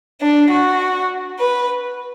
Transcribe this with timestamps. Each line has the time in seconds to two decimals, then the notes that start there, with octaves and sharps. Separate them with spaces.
0.21 D4
0.51 F#4
1.39 B4